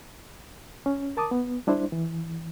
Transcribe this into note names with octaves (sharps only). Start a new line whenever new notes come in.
C#4
A#4 A5 D6 D#6
B3
G3 D4 E4 C5
E3